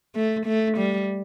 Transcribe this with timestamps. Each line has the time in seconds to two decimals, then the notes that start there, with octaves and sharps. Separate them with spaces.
0.15 A3
0.46 A3
0.78 G3